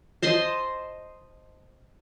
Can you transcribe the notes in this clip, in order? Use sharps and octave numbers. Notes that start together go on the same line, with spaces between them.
C5 D#5 A5 C6